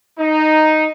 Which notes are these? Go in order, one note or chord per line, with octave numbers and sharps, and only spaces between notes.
D#4